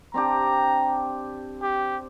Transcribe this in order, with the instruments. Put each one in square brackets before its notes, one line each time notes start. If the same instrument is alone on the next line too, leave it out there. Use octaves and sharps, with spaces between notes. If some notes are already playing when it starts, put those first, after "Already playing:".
[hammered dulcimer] C4 D4 G4 [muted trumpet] A#5
[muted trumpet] G4